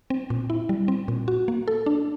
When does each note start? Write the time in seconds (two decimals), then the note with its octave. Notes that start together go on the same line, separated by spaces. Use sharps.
0.10 C4
0.30 A#2
0.50 E4
0.69 G3
0.88 C4
1.08 A#2
1.28 F#4
1.48 A#3
1.68 A4
1.86 D4